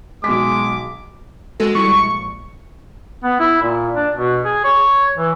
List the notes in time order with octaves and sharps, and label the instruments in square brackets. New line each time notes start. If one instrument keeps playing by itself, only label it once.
[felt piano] B1 B6 [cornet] G#3 [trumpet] D6
[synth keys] G#3 F#4 A4
[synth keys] G3 G#3 E4 [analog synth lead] C#6
[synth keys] A#1
[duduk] B3
E4
A#2
D4
B2
G#4
C#5
E3